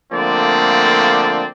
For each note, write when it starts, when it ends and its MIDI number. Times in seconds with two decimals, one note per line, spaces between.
0.13 1.46 50
0.13 1.46 53
0.13 1.46 57
0.13 1.46 58
0.13 1.46 60
0.13 1.46 74